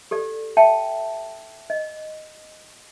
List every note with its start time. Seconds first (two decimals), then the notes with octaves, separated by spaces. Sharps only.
0.11 G4 A4 D5
0.57 E5 G5 A5
1.70 D#5